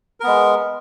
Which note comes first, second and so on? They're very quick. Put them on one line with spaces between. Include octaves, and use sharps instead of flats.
A#4 B3 G#3